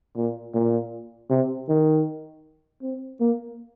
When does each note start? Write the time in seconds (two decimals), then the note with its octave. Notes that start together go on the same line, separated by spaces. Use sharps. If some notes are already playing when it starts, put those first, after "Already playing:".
0.16 A#2
0.55 A#2
1.30 C3
1.69 D#3
2.83 C4
3.21 A#3